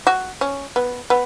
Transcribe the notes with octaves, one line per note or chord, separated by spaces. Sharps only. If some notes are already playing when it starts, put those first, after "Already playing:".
F#4
C#4
B3
B3